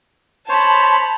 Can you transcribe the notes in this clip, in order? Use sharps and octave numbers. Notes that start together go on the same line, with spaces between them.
C5 C#5 A5 B5